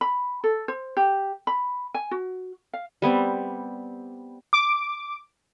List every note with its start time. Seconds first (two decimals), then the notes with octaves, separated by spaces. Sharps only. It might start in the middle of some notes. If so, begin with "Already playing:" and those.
0.01 B5
0.44 A4
0.68 C5
0.97 G4
1.47 B5
1.94 G#5
2.11 F#4
2.73 F5
3.02 G3 B3 C4
4.53 D6